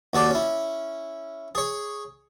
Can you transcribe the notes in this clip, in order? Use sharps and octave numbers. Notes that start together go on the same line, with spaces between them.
D#2 F#4 A4 D5
C#4 E4
G#4 C#5